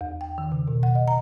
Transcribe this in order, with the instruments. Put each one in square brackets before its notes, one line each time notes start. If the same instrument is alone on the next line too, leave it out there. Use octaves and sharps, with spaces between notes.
[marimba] E2
G5
D#3
C#3
B2
F#5
D#5
A#5